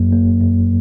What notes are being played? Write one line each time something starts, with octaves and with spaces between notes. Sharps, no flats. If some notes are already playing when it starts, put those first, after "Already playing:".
Already playing: F#2 F#3 A#3
A#3
F#2